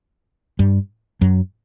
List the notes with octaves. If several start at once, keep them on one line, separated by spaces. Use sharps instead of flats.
G2 G3
F#2 F#3